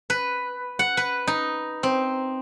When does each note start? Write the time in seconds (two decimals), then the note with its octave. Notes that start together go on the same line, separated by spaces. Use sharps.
0.10 B4
0.79 F#5
0.97 B4
1.27 D#4
1.83 C4